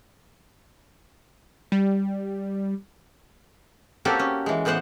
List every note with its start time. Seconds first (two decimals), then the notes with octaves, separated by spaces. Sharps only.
1.72 G3
4.05 A#3 C4 C#4 F#4 G4 A4
4.19 C#4
4.46 E3 G#3
4.65 A2 E3 B3 C5 F#5